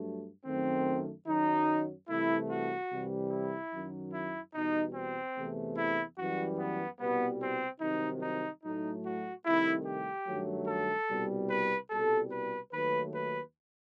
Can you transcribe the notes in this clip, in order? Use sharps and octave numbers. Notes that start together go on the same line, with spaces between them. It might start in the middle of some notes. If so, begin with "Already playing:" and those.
Already playing: G2 F#3 A3
F#2 D#3 A3 C4
F#2 D#3 F#3 D#4
C2 C3 E3 A3 E4
F#4
C2 C3 E3 G3
E4
F#2 D#3 F#3
E4
E2 B2 G3 D#4
C4
E2 C3 E3 A3
E4
F#2 E3 G3 F#4
B3
C2 B2 G3 B3
C4
C2 C3 D#3 F#3 D#4
D#4
A2 F#3 A3 D#4
F#4
C2 C3 D#3 A3 E4
G4
G2 D#3 F#3 A3
A4
C2 B2 G3
B4
C2 B2 G3 A4
B4
D#2 D#3 F#3 A3 B4
B4